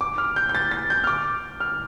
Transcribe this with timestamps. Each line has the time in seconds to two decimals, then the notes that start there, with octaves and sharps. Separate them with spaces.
0.01 D6
0.18 F6
0.36 G6
0.49 G6
0.55 A6
0.71 A6
0.90 G6
1.04 F6
1.07 D6
1.60 F6